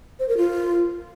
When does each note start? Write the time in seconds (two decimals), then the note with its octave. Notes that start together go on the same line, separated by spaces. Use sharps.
0.20 C5
0.29 A#4
0.37 F4